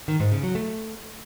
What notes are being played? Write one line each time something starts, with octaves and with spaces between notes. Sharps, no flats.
D#3
G#2
C#3
F#3
A3